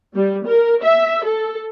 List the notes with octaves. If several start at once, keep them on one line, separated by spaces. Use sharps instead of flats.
G3
A#4
E5
A4